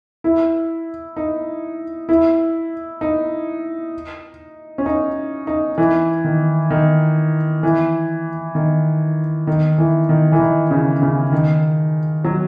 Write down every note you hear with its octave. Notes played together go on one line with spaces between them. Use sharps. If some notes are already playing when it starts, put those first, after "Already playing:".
E4
D#4
E4
D#4
C#4
D#4
D#4
E3
D#3
D#3
E3
D#3
D#3
E3
D#3
E3
D#3
C#3
C#3
D#3
F#3